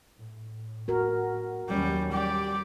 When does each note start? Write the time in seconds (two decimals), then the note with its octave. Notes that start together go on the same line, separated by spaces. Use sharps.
0.18 A2
0.88 F#4 A#4
1.69 D#2 F#3 G3 C#4
2.12 G3 G4 D5